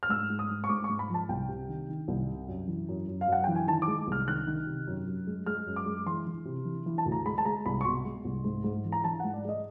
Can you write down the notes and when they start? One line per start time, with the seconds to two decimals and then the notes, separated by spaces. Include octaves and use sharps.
0.03 F6
0.09 G#2 E6
0.29 G#2
0.39 D#6
0.50 G#2
0.64 C#6
0.69 G#2 D6
0.84 C#6
0.89 G#2
0.99 B5
1.10 F3 A5
1.29 C2 G5
1.49 C3
1.68 D#3
1.89 D#3
2.08 C2
2.28 C3
2.48 F#2
2.68 E3
2.89 F#2
3.08 F#2
3.21 F5
3.28 F#2 F#5
3.44 E3 G5
3.55 G#5
3.67 D#3 A5
3.82 D6
3.88 G#3
4.07 C2 F6
4.28 D#3 F#6
4.47 D#3
4.66 C3
4.87 F#2
5.06 F#2
5.27 G#3
5.46 G#3 F6
5.66 F#2
5.76 D6
5.86 G#3
6.06 E3 C6
6.27 E3
6.45 C3
6.65 E3
6.86 E3
6.98 A5
7.06 D2
7.12 A#5
7.26 G#3 B5
7.38 A5
7.45 G#3 A#5
7.66 C2 B5
7.81 C#6
7.85 B2 C6
8.05 G#3
8.25 C2
8.45 G#2
8.64 G#2
8.85 E3
8.92 A#5
9.04 E3 A5
9.20 G#2 F#5
9.34 D5
9.45 G#3 D#5